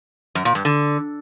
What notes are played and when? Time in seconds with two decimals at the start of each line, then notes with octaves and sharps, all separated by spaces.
0.35 F#2
0.45 A#2
0.55 G2
0.65 D3